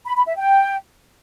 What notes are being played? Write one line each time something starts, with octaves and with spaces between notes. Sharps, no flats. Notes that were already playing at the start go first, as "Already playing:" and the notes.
B5
B5
E5
G5